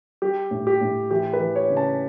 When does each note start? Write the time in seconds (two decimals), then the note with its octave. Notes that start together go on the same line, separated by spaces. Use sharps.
0.22 G3 G4
0.51 A2
0.67 G4
0.81 A2
1.11 E3 G4
1.33 B4
1.40 E3
1.56 C#5
1.70 C#3
1.77 A5